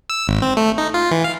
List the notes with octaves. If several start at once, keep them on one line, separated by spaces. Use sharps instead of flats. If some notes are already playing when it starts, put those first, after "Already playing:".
E6
G#1
C4
A3
D#4
F4
E3
F5